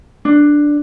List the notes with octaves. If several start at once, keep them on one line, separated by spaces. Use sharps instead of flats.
D4